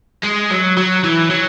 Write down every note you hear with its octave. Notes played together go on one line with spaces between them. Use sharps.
G#3
F#3
F#3
E3
F#3